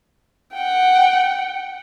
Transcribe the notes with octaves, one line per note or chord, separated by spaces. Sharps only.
F#5 G5